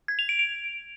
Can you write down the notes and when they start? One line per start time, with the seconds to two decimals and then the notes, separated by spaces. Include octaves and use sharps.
0.08 G#6
0.19 F7
0.29 D7
0.39 D7